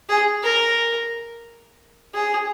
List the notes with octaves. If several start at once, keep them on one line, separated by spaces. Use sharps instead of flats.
G#4
A#4
G#4